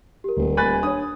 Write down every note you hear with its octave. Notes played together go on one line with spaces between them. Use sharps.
G4 A#4
D#1 D2
G#5 B5 F#6 A6
D4 C#5 D#6